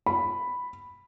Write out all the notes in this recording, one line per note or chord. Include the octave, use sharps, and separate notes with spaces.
B5